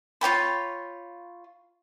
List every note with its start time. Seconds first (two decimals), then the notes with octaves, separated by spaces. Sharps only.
0.21 F4 C#5 G5 B5